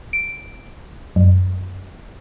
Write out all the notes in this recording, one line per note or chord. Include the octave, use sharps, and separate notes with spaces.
D7
F#2